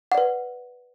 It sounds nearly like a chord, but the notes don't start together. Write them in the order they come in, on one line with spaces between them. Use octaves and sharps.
F#5 D5 B4